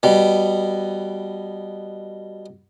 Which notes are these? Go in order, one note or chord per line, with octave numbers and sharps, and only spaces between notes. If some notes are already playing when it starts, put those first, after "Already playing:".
B2 G3